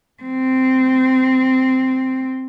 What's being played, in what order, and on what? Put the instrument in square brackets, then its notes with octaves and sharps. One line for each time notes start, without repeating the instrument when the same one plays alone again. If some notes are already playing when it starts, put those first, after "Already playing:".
[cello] C4